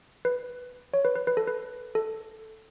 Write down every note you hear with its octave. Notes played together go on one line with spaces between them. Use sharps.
B4
C#5
B4
B4
B4
A4
B4
A4